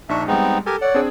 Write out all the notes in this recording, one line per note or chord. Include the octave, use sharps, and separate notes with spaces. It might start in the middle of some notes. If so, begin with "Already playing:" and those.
A#1 D4 D#4 E5 C#6
G3 G#3 B3 C4 D#4
G4 A4 A#4 G#5
C#5 D5 F#5
C4 D4 G#4